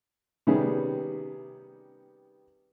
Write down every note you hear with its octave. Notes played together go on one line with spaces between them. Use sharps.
C3 D#3 G3 B3 C#4 G#4